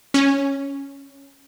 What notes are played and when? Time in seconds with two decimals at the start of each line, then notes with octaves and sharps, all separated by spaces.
0.14 C#4